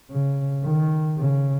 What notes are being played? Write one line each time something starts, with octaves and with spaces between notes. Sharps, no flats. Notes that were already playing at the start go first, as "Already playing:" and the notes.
C#3
D#3
C#3